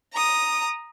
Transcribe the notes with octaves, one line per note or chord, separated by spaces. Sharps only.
A#5 D#6